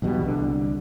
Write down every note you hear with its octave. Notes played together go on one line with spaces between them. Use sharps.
B1 E2 B2 G3
C2 D3